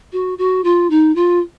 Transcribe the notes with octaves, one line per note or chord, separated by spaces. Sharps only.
F#4
F#4
F4
D#4
F4